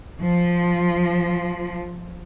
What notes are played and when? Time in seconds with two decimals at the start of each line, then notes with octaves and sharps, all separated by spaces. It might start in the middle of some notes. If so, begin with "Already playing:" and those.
0.22 F3